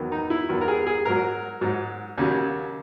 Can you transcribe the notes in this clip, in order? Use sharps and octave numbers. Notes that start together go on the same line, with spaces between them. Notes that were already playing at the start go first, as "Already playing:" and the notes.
Already playing: E2 D#3 F#3
D#4
E4
E2 D#3 F#3
A#4
G#4
G#4
G#2 F#3 A#4
G#2 F#3
D#2 C#3 F#3